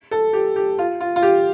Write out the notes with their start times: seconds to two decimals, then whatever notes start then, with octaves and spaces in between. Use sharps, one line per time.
0.11 A4
0.33 G4
0.56 G4
0.78 F4
1.00 F4
1.16 F4
1.23 G4